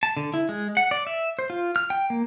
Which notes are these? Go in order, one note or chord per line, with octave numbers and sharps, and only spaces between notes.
A5
D3
E4
G#3
F#5
D5
E5
C5
F4
F6
G5
A#3